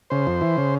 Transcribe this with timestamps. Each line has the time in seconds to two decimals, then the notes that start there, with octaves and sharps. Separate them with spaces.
0.10 C#3 C5
0.27 F2
0.41 E3
0.58 C#3